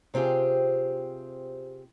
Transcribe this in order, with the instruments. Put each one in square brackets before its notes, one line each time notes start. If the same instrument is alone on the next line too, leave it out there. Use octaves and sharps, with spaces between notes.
[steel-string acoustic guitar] C3 C4 F4 G4 G#4